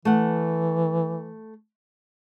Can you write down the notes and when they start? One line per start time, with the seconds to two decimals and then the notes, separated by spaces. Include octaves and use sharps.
0.05 E3 A3 F#5